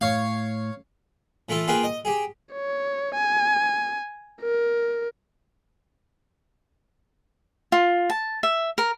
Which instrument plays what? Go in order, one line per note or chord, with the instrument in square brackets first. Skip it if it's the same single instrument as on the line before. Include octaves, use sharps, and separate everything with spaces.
[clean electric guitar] A2 [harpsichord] C#5 F5
[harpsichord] E3 A3 E4 F4 A4
A#3 F4 G#4 B4 F5 G5
D#5
G4 G#4
[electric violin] C#5
G#5
A#4
[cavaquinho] F4
A5
E5
A#4